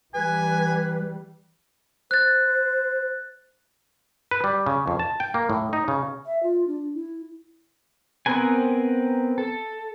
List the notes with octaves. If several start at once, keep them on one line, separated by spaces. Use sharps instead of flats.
E3 G3 B4 G#5
C5 F#6 A6
B4
G3
C#3
F2
A5
G5
A#3
A2
D#4
C#3
E5
F4
D4
E4
B3 C4 A#4 B4 G#5
A4